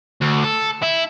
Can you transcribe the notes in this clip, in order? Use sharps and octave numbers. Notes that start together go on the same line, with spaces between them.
D2
A4
E4